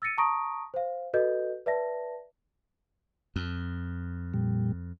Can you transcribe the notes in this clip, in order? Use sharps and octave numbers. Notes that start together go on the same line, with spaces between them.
E6 A6 A#6 C#7 D#7
A5 A#5 C#6 D#6 A#6 D7
C5 F5
F#4 A4 B4 D#5 G6
B4 D5 E5 A5 A#6
F2
A#2 G3